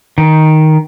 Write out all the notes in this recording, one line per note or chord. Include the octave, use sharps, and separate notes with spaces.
D#3